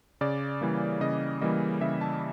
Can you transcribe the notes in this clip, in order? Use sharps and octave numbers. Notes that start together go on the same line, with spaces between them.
C#3 D5
E3 G3 A#3
C#3 D#5
E3 G3 A#3 D#5
C#3 E5
A5